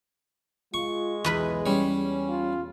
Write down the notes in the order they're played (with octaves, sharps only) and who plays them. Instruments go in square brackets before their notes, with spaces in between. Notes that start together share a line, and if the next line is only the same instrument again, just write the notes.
[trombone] G#3 [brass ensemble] F4 [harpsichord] C#6
[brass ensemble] B1 [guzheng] E2 B4 B5
[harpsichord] G3 C#5 [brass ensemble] C#4
[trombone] F4